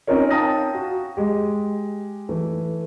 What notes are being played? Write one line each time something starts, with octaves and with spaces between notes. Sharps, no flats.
C4 C#4 D#4 F4 A#4 C#5
F5 G5 A5 A#5 D#6 A#6
F#4
G#3 G4
E3 A3